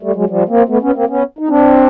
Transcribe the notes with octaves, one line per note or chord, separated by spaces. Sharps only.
G3 A3
F#3 G#3
F3 G3
A#3 C4
A3 B3
B3 C#4
A#3 C4
B3 C#4
D#4
C4 D4